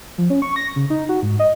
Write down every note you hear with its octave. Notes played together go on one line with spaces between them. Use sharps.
F3
C#4
C#6
A#6
C#3
D#4
F#4
G#2
D#5